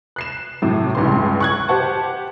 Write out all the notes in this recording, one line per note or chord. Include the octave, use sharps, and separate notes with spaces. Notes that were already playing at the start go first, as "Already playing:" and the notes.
F#6 C7 E7
A2 C3 F#3
C#2 G2 E3 C6
C#6 F#6 G#6
G4 C5 F#5 A5